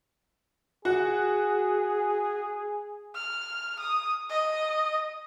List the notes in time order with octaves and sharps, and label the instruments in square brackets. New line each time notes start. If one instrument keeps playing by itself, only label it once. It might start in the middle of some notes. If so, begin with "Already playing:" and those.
[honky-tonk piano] F#4 [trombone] G#4
[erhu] F6
D#6
D#5